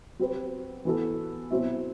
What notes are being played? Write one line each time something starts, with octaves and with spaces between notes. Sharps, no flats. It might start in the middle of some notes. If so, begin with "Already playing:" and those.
F#3 C4 G4 B4
E3 B3 F#4 A4
B2 F#3 C4 E4